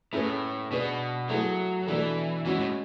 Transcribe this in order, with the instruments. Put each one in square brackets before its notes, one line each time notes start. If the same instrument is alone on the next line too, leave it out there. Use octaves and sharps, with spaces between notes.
[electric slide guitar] A2 [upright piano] A3 C#4 G#4 B4
[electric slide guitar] B2 [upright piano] B3 D4 G#4
[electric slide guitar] F#3 [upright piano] A3 E4 G#4
[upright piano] B2 A3 D4 A4 [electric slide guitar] E3
[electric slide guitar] E3 [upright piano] G#3 C#4 F#4
[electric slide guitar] A2